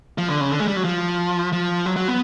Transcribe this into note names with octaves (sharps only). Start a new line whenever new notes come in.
F3
D3
C#3
D3
G#3
G3
F#3
F3
F3
F#3
F#3
B3